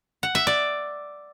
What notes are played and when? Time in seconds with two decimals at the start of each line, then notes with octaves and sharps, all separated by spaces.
0.23 F#5
0.35 E5
0.47 D5